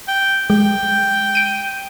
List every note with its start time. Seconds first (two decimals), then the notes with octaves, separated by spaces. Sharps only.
0.08 G5
0.50 G#3 G5
1.35 D7 D#7